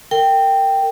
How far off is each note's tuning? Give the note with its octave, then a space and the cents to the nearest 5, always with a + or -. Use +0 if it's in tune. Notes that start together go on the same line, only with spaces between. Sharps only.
A#4 -30 G5 +0